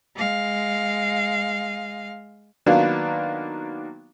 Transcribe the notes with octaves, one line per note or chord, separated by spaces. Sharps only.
G#3 F5
D#3 F#3 A#3 B3 D4 F4